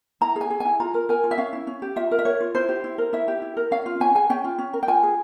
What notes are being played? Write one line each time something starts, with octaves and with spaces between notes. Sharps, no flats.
E4 A#5
G#4
G#5
G#4
E4 G#5
F4 A#5
A#4
A#4 G#5
F4
E5
C#4 F5
E4
C#4
G4
F4 E5
A#4
E5
A#4 C#5
F4
E4 C5
G4
E4
A#4
E4 E5
G4
E4
A#4
C#4 F5
F4
C#4 G#5
G#4 G#5
C#4 G5
F4
C#4
A#4
G5
F4 G#5
G#4